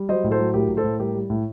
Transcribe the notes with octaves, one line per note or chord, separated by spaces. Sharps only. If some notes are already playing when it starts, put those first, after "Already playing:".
Already playing: G3
F#3 C5 D#5
A2
A4 C5
F#3
A2 G4 A#4
A2
A4 C5
A2
G3 G4 A#4
G3
A2